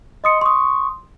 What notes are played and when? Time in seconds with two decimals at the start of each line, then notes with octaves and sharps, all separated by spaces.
0.24 D#5 C6 D#6 C#7
0.41 C6 C#6 D#6